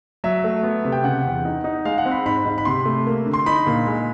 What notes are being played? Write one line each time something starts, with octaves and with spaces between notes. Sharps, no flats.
F#3 E5
A3
B3
C3
G5
C#3 F#5
E2
D#4
D#4
G#3 F5
F#5
C4
B5
G#2 B5
G#2
B5
C3 C6
A3
A#3
D3
C6
D#4 B5
A#2
G#3